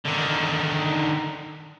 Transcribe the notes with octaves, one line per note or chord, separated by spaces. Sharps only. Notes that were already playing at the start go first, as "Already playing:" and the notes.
D3 D#3